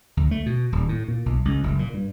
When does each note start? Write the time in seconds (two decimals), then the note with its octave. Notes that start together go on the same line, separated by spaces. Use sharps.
0.17 D2
0.31 A3
0.46 B2
0.72 D#1
0.89 A2
1.08 A#2
1.26 B1
1.45 C#2
1.63 F#1
1.79 A#2
1.94 G2